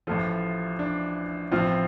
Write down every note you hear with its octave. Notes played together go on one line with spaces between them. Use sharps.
A1 A2 F3 F4 A4
D4
A1 A2 F3 C4 F4